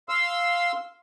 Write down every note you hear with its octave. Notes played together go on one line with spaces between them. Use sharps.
F5 C6 E6